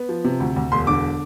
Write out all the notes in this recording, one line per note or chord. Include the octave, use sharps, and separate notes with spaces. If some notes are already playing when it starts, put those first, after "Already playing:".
Already playing: B3
F3
C3
D2
D2
E1 C6
D3 D6